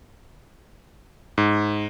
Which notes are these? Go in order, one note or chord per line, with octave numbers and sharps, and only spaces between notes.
G#2